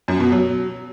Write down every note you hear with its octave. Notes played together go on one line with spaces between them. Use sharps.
F#2
B2
F#3